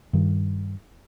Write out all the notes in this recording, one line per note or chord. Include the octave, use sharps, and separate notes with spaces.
G2 D#3